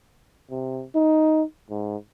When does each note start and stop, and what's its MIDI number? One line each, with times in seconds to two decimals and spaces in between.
0.50 0.84 48
0.95 1.43 63
1.71 1.97 44